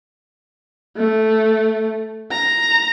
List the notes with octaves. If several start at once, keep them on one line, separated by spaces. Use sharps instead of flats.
A3
A#5